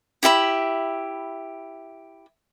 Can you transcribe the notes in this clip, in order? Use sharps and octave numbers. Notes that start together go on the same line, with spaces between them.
E4 G4 E5 B5